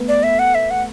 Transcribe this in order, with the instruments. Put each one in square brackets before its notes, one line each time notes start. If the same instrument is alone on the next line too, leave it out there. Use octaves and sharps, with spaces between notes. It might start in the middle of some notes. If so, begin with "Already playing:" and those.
Already playing: [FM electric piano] A3 B3
[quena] D5
E5
F#5
E5
F#5